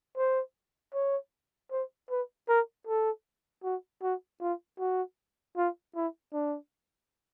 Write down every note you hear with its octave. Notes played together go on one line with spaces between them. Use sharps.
C5
C#5
C5
B4
A#4
A4
F#4
F#4
F4
F#4
F4
E4
D4